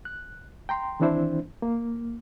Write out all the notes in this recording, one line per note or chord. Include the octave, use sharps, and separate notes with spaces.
F#6
G5 A#5 C6
D#3 E3 C4 D4 E4 C5
A#3